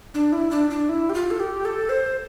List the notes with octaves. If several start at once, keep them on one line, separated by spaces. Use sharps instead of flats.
D4
E4
D4
D4
E4
G4
F4
A4
G4
A4
C5